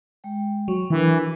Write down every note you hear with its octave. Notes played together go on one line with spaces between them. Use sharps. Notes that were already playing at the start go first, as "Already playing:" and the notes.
G#3 G5
F#3 C#6
E3 D4 A#4 B4